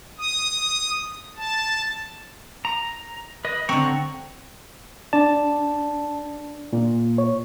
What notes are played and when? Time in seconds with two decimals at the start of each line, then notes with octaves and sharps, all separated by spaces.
0.18 D#6
1.37 A5
2.65 A#5
3.45 B4 D#5
3.69 D3 C4 F#5 A#5 C#6
5.13 D4 D5 A5
6.73 A#2
7.18 C#5